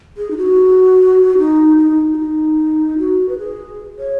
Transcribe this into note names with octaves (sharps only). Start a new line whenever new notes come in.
G#4
D#4
F#4
D#4
D#4
F#4
D#4
F#4
B4
G#4
C#5